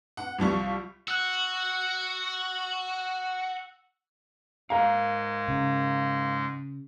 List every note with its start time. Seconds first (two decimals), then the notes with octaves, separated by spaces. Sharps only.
0.17 F#5
0.38 C2 F3 G3 C#6
1.08 F#4 E6 F#6
4.70 G#2 G#3 A#4 F5 A#5
5.48 C#3